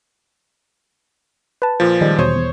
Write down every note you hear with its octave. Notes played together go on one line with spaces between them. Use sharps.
B4 A5
A#2 F3
D#3 G3 G#3
E2 B2 C5 C#5 D#6
E2